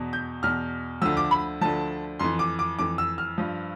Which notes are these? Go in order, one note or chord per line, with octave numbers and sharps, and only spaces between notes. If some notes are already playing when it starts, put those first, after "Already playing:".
Already playing: E2 B2
G6
E2 B2 F6
D2 D3 F3 E6
D6
B5
D2 D3 F3 A5
F2 E3 C6
D6
D6
F2 E3 D6
E6
F6
G2 F3